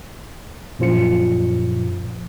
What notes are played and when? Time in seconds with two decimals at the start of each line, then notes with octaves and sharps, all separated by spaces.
0.79 F#2 A#2 F3 F4 C#7